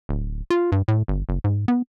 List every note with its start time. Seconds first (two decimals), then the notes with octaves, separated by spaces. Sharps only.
0.09 D1
0.50 F4
0.72 G2
0.88 A2
1.08 G1
1.29 F#1
1.44 G#2
1.68 B3